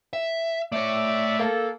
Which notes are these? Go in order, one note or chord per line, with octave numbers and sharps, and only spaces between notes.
E5
A3 C#5 D5 E5
A#3 A4